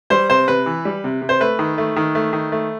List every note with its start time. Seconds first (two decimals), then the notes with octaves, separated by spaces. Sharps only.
0.10 G3 C5
0.30 C3 C5
0.48 C3 B4
0.66 E3
0.85 G3
1.04 C3
1.22 C3
1.29 C5
1.40 A3 B4
1.59 D#3
1.78 A3
1.96 D#3
2.15 A3
2.33 D#3
2.52 A3